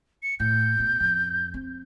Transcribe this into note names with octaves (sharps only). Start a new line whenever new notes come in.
C#7
A2 G6
B2
F2
C4